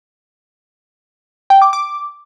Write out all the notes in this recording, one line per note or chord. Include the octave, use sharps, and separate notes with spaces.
G5
D6
D6